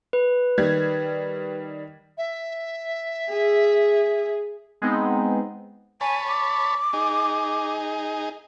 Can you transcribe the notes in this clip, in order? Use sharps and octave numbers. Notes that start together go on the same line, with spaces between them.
B4
D#3 G3 G#6
E5
G#4
G#3 B3 C4 D#4
C#5 G#5 A5 B5
D6
D#4 G#4